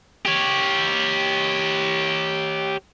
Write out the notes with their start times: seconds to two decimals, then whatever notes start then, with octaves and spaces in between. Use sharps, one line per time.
0.26 G4 C#5